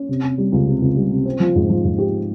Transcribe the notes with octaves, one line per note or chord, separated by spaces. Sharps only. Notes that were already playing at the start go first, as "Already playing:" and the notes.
Already playing: C#4
C3
C3
G3
C#2
C3
C#2
G3
C3
C4
F3
G#2
F3
G#2
G4